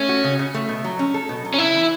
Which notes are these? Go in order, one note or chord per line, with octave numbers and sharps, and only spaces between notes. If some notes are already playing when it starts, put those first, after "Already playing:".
Already playing: A3 C#4
F#4
C#3
C#3
A3
B2
F#3
C#4
A4
B2
F#3
C#4
C#3 E4
E3